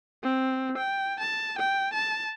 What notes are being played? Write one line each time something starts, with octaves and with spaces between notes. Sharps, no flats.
C4
G5
A5
G5
A5